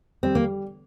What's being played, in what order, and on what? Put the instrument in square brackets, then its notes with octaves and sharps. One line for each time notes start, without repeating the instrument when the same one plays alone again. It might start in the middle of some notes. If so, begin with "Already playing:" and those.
[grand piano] G3 [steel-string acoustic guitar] C4
[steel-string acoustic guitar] A#3